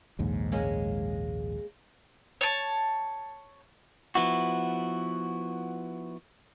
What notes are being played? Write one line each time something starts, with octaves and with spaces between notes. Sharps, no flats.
A#1 D#2 G#2
G#3 A#3 C#4
C#5 A5
F3 B3 E4 F#4